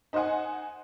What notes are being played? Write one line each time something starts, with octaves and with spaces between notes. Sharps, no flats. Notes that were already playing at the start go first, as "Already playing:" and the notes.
D#4 C5 D#5 F#5 G#5